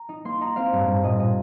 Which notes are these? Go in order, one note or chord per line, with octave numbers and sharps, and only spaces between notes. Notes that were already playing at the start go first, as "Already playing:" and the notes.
Already playing: A#5
D#4
A#3 C6
D#4 A#5
C4 F5
G2
G2
A#2 D#5
A#2 D#5